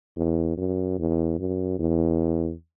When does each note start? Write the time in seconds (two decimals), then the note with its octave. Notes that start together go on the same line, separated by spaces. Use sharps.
0.17 E2
0.57 F#2
0.99 E2
1.39 F#2
1.79 E2